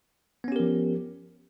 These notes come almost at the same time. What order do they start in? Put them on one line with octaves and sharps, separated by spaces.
B3 C#4 G4 A#4 F3